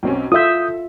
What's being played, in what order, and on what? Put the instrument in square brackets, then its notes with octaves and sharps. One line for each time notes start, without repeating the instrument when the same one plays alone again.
[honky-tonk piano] B1 C4 C#4
[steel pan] F4 E5 [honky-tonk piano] A4 [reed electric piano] D#6 G6